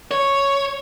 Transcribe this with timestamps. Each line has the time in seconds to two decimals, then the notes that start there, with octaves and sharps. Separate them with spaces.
0.11 C#5